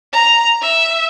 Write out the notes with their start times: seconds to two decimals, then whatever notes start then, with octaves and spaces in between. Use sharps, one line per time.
0.13 A#5
0.62 E5